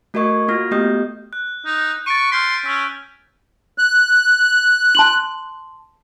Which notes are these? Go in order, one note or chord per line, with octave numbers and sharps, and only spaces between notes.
A3 F#4 A#4 D#5 C#6 G#6
A#3 F4 F#4 F6 A#6
A3 B3 G4 D#5 D#6 G6
F#6
D#4
C#6 A6 D7 D#7
C6 F6 G6 B6
C#4 E6 B6
F#6
A5 C6 F#7